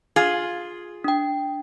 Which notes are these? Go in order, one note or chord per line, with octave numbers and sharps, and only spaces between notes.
F4 G#4
D4 G5